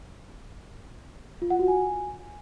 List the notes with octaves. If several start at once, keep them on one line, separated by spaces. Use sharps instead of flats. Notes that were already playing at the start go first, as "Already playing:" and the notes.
F4
F#5
F#4
G#5